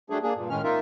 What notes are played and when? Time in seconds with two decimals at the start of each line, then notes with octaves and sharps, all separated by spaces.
0.10 F#3 G3 A3 D4 G#4
0.23 A#3 D4 G#4
0.36 G2 A#2
0.50 A2 D#3 G#3 C#4 F6
0.63 A#3 D#4 F4 A#4 E5